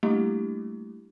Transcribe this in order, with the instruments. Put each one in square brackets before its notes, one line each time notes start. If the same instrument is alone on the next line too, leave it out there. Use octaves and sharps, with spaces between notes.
[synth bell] G3 A3 A#3 D4 E4 G4